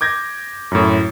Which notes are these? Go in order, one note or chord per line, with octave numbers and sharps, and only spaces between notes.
D6 G6 G#6 A#6
F#2 A2